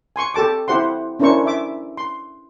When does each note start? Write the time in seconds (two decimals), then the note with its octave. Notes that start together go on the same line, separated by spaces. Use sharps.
0.16 G#5 C6 C#6
0.34 G4 A4 A5 D6
0.68 E4 G4 C5 F#5 C6
1.19 C#4 D4 E4 A#4 C5 C#6
1.46 E5 D6
1.97 C6